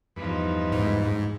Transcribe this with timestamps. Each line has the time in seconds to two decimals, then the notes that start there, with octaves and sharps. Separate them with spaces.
0.16 E2 G2 F3 D#4 B4
0.72 G#2